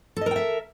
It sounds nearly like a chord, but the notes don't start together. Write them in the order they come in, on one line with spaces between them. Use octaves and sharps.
A4 D#5 A#4 G5 E5